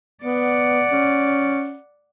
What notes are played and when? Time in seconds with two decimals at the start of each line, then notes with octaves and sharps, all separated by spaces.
0.24 B3 D5 F#5
0.92 C#4